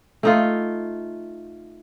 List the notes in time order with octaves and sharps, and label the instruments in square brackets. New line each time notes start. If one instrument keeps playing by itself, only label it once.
[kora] A3 D#4 F4